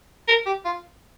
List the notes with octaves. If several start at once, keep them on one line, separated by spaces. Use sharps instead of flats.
A#4
G4
F4